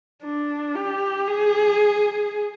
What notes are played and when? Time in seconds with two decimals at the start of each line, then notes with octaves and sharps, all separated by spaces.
0.23 D4
0.75 G4
1.28 G#4